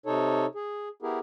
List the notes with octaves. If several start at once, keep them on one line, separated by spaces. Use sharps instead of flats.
C3 D#4 A4 C#5
G#4
B3 E4 G4 G#4 A#4